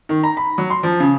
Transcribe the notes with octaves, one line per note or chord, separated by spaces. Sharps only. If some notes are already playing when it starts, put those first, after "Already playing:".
D#3
A#5
B5
F#3
C6
F3
C#3